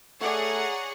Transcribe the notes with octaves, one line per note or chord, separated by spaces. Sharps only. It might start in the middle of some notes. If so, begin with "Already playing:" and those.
A3 G#4 C#5 D5 F#5 A#5